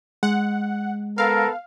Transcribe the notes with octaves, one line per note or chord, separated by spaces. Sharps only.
G#3 F#5
B3 A4 A#4 F5